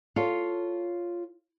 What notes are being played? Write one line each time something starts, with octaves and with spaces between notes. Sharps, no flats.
F4 A4 C#5 F5